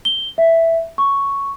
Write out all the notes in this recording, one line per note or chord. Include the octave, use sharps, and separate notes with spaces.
G7
E5
C#6